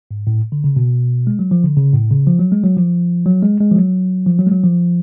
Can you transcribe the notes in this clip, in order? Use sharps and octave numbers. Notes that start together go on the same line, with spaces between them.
G#2
A2
D3
C#3
B2
G#3
F#3
F3
D3
C#3
A2
C#3
F3
F#3
G#3
F#3
F3
F#3
G#3
G#3
F3
F#3
F3
F#3
G#3
F#3
F3